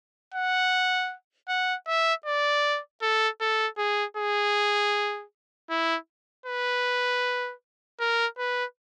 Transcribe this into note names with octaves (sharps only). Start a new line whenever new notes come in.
F#5
F#5
E5
D5
A4
A4
G#4
G#4
E4
B4
A#4
B4